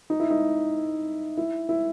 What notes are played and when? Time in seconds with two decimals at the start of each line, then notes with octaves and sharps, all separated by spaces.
0.10 D#4
0.20 E4
0.30 D#4
1.37 E4
1.69 E4